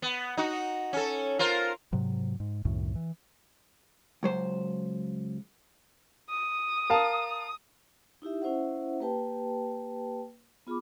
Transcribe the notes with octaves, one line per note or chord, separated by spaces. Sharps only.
B3
D#4 F#4
C#4 A4
F4 A#4 C5
G#2 C3 F#3
G#2
C2 F#2 A2 D#3
E3
C#2 F#3 C5
D#6
A#4 F5 A5
D#4 E4 G4 E5
C#4 E4 C5 E5 F#5
A#3 G4 B4 G5 A5
B3 F4 G#4 B5 D6